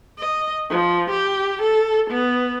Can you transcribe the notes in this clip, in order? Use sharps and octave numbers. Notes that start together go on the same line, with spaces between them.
D#5
F3
G4
A4
B3